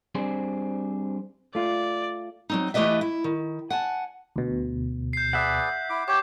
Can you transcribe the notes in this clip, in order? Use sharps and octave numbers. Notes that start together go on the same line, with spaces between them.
G3 C4 D4 G#4 C5
A3 F4 D5
F#3 C4 D#4
E3 A3 G4 B4 D#5 E5
E4
D#3
F#5 G#5 A5
D2 B2
G6 C7
G#4 B4 D5 E5 F#5
E4 D6
G4 C#5 D6 G6